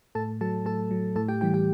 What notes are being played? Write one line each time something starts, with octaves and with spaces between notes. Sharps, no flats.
A2 A4 A5
F#3 A4 A5
A2 A4 A5
F#3
A2 A4 A5
G4 G5
E3 G3 G4 G5
G4 G5